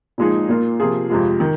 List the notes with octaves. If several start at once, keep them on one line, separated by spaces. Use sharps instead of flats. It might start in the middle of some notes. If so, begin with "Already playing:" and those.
A#2 F3 G#3 D#4 G#4
A#2 A#3 F4
C3 F3 A#3 F4 G#4
F2 C3 G#3 F4
D#3